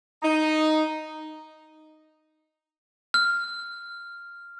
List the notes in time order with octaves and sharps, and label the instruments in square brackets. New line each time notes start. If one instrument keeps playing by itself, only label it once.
[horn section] D#4
[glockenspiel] F6